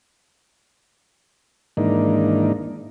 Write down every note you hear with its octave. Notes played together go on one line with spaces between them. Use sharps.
G#2 D#3 E3 A#3 D4 D#4